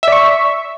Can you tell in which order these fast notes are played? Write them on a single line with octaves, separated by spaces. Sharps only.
E5 D5 C#6